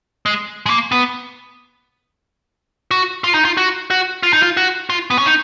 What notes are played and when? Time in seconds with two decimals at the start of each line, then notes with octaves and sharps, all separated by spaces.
0.26 G#3
0.66 G#3
0.70 A#3
0.92 B3
2.91 F#4
3.24 F4
3.34 D#4
3.45 F4
3.57 F#4
3.90 F#4
4.23 F4
4.33 D#4
4.43 F4
4.57 F#4
4.90 F4
5.10 B3
5.18 C#4
5.26 D#4